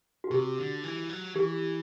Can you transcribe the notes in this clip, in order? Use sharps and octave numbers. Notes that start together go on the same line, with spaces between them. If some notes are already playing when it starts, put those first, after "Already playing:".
F#4
C3 G4
D3
E3
F#3
E3 G4